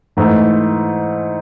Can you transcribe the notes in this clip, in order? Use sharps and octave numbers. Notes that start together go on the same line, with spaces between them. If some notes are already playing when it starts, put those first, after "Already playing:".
G#2 E3 A3